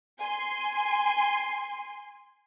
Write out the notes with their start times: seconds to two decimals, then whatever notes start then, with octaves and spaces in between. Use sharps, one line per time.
0.19 G#5 C6